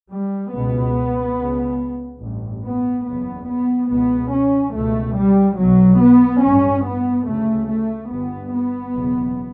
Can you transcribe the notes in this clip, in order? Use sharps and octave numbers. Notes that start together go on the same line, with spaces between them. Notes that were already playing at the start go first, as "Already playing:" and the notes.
G3
C#2 B2 B3
C#2 C#3
A1 G2
B3
F#1 E2 C#3 B3
B3
C#2 B2 B3
C#4
C#2 B2 A3
G3
B1 B2 F#3
B3
A1 G2 C#4
B3
D2 C#3 A3
A3
G1 G2 B3
B3
F#1 E2 B2